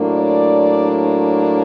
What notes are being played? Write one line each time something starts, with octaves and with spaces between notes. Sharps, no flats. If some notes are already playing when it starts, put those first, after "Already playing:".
Already playing: A2 F#3 A#3 D4
D5